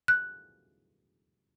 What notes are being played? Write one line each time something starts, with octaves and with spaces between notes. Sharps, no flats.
F#6